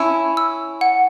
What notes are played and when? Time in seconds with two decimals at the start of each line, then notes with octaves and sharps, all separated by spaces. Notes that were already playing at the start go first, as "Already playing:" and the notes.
Already playing: C#4 E4 E6
0.37 E6
0.81 F#5